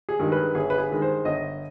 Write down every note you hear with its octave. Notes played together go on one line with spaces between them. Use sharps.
G#4
G2 D#3 G#3
B4
G1 G#4
B4
G#4
G2 D#3 G#3
C5
G1 D#5